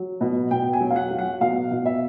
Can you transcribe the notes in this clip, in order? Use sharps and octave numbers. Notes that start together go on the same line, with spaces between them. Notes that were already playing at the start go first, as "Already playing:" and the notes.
Already playing: F#3
B2
B2 G5
G#5
F#3
F5
F#5
F#3
F#5
B2 F5
B2
E5